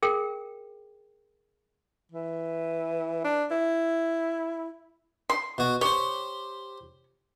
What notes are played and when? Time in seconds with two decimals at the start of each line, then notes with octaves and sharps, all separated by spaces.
0.03 G#4 A#4 G5
2.12 E3
3.24 D4
3.51 E4
5.30 C6
5.58 B2 F#4
5.81 G4 C5 C#5